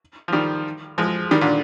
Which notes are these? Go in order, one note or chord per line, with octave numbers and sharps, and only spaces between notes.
F3
D#3 G3
F3 G#3
D#3 G3
A#2 D3